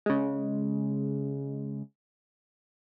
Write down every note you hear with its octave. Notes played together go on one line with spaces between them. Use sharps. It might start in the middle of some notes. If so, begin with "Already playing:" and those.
C#3 G#3